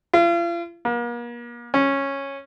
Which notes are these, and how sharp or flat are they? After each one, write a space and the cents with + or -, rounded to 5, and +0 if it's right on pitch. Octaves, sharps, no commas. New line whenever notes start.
F4 -40
A#3 +40
C#4 -10